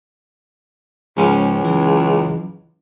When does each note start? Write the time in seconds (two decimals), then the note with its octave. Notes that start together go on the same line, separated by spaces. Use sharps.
1.17 C#2 G#2 F3 C#4
1.65 F#2 E3